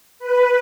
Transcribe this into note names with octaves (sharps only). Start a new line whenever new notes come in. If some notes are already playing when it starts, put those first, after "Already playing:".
B4